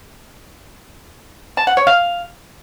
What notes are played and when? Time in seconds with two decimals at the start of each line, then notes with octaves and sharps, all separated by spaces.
1.57 A5
1.67 F#5
1.77 C#5
1.87 F5